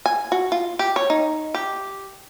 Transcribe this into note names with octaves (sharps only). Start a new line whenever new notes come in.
G#5
F#4
F4
G4
C#5
D#4
G4